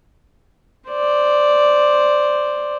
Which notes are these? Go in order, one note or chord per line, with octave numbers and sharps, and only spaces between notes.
C5 D5